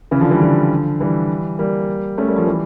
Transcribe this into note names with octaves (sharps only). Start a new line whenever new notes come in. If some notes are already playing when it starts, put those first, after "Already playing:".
C#3 E3
D3 F3
E3 G3
D3 F3
E3 G3
G3 A#3
A3 C#4
G3 A#3
F3 A3
E3 G3